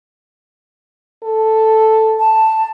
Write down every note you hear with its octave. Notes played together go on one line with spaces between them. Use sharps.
A4
A5